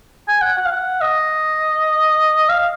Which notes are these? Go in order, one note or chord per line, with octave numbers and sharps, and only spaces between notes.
G#5
F#5
F#5
F5
F#5
D#5
F5